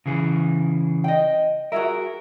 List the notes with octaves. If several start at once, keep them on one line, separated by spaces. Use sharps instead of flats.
C#3 E3 G#4
D#5 G5
F#4 G#4 A#4 E5